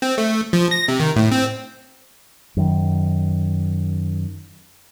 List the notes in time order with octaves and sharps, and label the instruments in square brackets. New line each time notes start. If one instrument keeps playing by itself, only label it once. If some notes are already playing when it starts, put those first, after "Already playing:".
[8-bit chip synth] C4
A3
F3
A#6
C3
D#3
A2
C4
[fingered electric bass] F#2 D#3